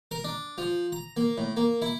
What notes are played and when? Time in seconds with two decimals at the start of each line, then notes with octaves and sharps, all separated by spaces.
0.11 A#4
0.24 D4
0.58 F3
0.92 A#5
1.17 A#3
1.38 A2
1.57 A#3
1.82 E4